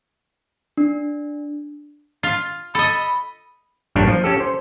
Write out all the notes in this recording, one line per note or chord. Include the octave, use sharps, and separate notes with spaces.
D4
F4
A4 D#5 B5
A1 G2 A#2 D4 C#5 G5
F3
C#4 G4 A4
C5